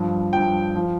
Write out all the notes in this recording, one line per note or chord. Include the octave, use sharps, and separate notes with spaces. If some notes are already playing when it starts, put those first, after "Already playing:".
Already playing: G2 F3
G2 F3 G5
F3